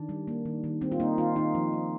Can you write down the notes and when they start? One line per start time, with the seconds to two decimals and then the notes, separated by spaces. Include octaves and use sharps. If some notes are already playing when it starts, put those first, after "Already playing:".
Already playing: D#3 D4
0.09 G3
0.28 A#3
0.45 D#3
0.64 D#3
0.81 G3 C4
0.92 F4
1.00 A#3 D#4
1.18 D#3 F4
1.36 D#3 D#4
1.55 F3
1.73 A#3